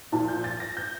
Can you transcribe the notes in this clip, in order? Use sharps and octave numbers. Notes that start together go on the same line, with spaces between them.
A#2 F3 A5
G6
A6
A#6
G6